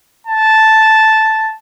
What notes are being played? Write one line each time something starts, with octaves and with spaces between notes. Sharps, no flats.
A5